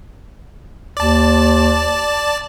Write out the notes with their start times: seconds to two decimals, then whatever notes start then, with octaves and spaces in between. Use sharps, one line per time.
0.97 D#2 D5 A5